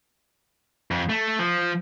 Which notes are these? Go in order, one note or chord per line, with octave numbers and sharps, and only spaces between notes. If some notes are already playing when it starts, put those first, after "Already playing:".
F2
A3
F3